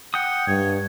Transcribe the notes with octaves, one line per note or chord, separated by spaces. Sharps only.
F#5 G5 D#6
G2 C#5